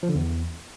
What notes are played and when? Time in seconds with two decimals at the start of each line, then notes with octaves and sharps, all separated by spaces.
0.03 F3
0.09 D3
0.15 E2